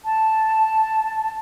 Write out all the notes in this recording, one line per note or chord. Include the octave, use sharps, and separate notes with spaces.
A5